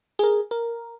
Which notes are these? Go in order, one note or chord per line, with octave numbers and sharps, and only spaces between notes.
G#4 A#4
A#4